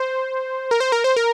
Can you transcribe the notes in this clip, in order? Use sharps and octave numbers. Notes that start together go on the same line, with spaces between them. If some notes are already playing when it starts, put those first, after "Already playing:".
Already playing: C5
A#4
C5
A#4
C5
A#4